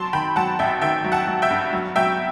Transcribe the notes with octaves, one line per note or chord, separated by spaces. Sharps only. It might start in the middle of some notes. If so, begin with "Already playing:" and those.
Already playing: F#3 A5 C6
D#3 G5 B5
F#3 F#5 A5
A1 E5 G5
D#3 E5 G5
F#3
F#5 A5
F#3
E5 G5
G2
F#3
F#3 E5 G5